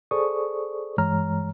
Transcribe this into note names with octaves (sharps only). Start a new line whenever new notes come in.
G#4 A4 C5 D5 C#6 D#6
G2 E3 G#3 C#5 A#5 F6